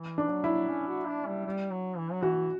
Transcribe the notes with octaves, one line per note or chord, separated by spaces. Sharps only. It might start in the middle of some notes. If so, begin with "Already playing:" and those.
Already playing: E3
D4
F#3
E4
C#4
F#4
D4
G3
G3
F#3
E3
F#3
E3 F#4